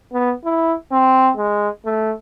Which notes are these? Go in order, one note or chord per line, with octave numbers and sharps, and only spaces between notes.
B3
E4
C4
G#3
A3